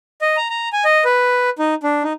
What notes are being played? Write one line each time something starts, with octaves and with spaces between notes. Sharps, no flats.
D#5
A#5
A#5
G#5
D#5
B4
D#4
D4
D#4